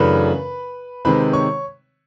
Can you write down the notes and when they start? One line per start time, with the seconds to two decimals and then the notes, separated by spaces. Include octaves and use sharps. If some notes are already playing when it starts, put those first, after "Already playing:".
Already playing: F#2 C#3 E3 A3 D4 B4 B5
1.05 C3 D#3 G#3 C4 B4 B5
1.33 C#5 C#6